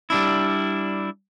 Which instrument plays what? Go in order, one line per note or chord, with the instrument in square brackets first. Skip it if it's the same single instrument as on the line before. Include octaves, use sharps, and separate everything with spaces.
[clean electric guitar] G3 D4 E4